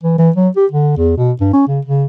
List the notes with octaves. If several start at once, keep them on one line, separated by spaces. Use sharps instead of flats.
E3
E3
F#3
G4
D3
E2
B2
G2
C#4
C#3
C#3